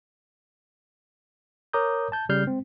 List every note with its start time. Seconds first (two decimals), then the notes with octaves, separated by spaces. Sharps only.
1.73 A#4 C#5 A#5 D6 D#6 G6
2.12 A5 G6
2.29 C#3 G3 F6 G6 C7
2.44 G#3 C4